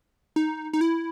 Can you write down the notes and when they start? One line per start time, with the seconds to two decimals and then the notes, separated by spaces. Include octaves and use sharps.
0.36 D#4
0.73 D#4
0.81 E4